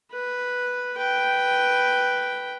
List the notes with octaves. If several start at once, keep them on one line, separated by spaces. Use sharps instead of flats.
B4
B4 G5